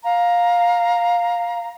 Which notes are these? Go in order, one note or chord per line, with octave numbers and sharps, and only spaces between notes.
F5 A#5